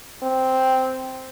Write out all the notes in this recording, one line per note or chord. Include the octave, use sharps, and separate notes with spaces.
C4